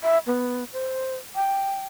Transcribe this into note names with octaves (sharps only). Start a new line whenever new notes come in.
E5
B3
C5
G5